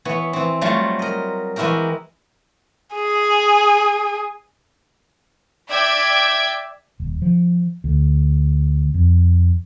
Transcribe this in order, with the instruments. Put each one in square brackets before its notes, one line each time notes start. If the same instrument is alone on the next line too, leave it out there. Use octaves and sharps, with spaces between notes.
[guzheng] E3 B3 C#5
E3 C4
F#3 G3 A3 F4
A#4 D#5
E3 G#3 E4 F#4 G4 A#4
[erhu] G#4
[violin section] D5 E5 G5 G#6 B6 D7
[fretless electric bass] D#1
F3
D2
F2